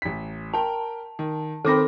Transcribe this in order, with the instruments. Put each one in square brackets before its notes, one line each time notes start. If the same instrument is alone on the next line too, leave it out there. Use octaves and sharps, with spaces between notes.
[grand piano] A1 B6
[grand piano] A#4 G5 [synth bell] A5
[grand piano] D#3
[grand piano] D#3 C4 B5 [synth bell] A4 D6 A#6